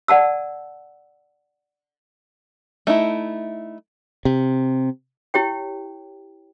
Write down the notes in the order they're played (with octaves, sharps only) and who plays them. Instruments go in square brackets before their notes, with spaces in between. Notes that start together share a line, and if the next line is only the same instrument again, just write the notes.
[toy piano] D5 F#5 A5 E6
[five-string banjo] A3 D#4 E4
[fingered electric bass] C3
[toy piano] E4 G4 C#5 G5